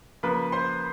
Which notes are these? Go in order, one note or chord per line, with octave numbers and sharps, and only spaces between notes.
C#3 F3 A#3 B4 B5
C5 C6